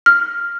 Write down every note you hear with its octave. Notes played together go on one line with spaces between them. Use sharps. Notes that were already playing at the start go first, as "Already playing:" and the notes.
F6